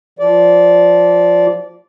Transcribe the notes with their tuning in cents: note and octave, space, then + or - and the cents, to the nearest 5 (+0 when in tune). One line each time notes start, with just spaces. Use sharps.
F3 +0 D5 -15